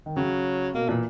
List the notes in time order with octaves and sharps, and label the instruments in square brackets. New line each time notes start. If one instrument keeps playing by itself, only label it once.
[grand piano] D#3
[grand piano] C#3 [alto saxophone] F#3
[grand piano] B2 [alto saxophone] A#3
[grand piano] A#2 [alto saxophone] E3